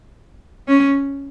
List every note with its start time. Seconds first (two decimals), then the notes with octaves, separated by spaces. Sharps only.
0.68 C#4